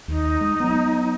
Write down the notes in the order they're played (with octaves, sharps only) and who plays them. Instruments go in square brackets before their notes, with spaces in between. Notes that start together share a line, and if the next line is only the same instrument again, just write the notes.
[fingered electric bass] D#2 [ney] D#4
[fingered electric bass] G#3
F#3 B3